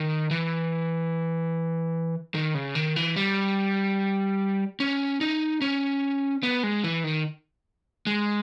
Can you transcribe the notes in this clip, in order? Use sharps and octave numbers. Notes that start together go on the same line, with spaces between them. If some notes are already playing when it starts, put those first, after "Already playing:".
Already playing: D#3
E3
D#3
C#3
D#3
E3
G3
C#4
D#4
C#4
B3
G#3
E3
D#3
G#3